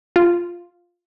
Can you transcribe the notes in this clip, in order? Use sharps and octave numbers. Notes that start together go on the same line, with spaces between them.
F4